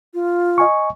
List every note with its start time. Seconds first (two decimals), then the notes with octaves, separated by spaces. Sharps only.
0.14 F4
0.58 D#5 G#5 C#6